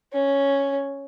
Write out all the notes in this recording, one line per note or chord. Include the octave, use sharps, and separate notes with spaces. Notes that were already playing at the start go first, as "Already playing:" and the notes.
C#4